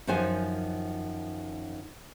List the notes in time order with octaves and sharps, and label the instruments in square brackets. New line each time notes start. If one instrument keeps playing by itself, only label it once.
[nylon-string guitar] F#2 D#3 F3 F#4 C5 G#5